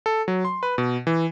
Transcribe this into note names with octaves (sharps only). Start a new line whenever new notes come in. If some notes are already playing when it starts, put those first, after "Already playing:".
A4
F#3
C6
B4
B2
E3